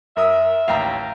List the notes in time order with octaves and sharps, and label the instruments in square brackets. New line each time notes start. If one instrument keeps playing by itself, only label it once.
[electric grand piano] F#2 A#4 D#6 [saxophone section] E5
[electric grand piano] A1 D#2 [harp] F5 G5 A#5